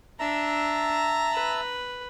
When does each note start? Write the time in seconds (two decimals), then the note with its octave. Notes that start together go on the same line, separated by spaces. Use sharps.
0.20 D4 E5 A5 A#5 E6
1.33 B4